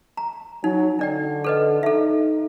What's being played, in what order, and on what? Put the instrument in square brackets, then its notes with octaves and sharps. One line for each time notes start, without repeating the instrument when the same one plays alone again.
[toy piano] A#5
[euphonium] F#3 [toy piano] D#4
[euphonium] D3 [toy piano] D4 D5 G5
[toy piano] A4 B4 D#5
[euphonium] D#4 [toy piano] A4 E5